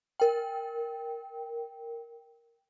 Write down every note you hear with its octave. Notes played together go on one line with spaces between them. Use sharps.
A#4 G5